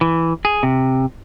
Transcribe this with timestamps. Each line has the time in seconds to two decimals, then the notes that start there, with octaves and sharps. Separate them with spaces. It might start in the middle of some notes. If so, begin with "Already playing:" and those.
0.01 E3
0.45 G#4
0.63 C3